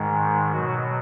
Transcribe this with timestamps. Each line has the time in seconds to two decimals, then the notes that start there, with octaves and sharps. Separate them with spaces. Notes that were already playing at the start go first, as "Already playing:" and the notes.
Already playing: G#2 D#3 G#3
0.52 B2 F#3 F#4